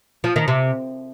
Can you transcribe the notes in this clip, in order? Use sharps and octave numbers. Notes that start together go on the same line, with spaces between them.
F3
D#3
C3